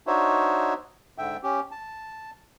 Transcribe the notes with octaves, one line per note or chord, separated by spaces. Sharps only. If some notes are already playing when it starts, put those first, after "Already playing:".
D4 D#4 F#4 C5 C#5 E5
G#2 D3 E5 G5
C#4 G4
A5